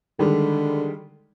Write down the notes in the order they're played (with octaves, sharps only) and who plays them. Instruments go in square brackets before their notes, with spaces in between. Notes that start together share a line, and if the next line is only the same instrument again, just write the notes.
[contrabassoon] D3 [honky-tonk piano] D#3 G3 G#3